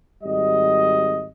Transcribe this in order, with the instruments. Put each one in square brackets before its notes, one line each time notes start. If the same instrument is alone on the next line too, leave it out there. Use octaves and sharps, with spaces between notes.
[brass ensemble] G#1 G3 D#5